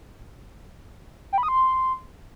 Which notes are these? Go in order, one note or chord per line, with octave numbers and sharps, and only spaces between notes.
G5
B5
D#6
C6